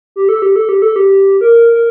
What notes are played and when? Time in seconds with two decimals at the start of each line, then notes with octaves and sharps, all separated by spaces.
0.16 G4
0.29 A4
0.42 G4
0.56 A4
0.69 G4
0.82 A4
0.96 G4
1.41 A#4
1.72 A#4